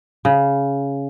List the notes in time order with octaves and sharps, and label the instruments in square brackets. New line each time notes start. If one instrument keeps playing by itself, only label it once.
[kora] C#3